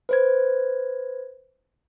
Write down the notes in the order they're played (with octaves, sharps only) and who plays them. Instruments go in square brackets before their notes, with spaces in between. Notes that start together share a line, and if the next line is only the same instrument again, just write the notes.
[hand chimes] B4 C5 G#6